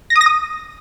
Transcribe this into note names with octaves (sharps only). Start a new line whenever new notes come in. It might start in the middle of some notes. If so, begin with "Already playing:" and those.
A#6
D#6
A#6
D#6